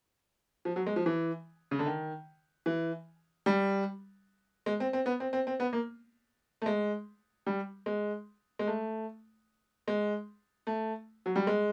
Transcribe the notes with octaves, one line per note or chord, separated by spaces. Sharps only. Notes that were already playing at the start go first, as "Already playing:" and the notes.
F3
F#3
G#3
F3
E3
C#3
D3
D#3
E3
G3
G#3
C4
C4
B3
C4
C4
C4
B3
A#3
A3
G#3
G3
G#3
G#3
A3
G#3
A3
F#3
G3
G#3